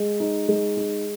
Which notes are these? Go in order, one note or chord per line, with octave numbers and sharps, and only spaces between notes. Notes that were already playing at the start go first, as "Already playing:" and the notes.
Already playing: G#3
D#4
G#3
D#4